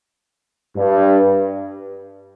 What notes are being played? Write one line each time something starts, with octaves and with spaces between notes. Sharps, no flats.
G2